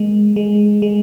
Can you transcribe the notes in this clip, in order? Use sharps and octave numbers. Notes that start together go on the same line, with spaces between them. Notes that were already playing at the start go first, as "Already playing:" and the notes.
Already playing: G#3 A#3
G#3
G#3